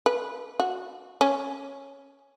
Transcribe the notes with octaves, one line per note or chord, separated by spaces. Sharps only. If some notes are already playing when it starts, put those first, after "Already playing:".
B4
F#4
C#4